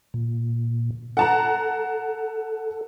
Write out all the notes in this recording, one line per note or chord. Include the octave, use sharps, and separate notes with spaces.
A#2
A4 F#5 A5 A#5